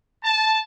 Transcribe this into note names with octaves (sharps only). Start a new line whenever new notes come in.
A5